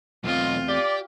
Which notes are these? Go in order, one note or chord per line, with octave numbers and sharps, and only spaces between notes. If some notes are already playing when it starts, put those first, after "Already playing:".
B1 E2 A3 C4 F4 D#5
G4 D5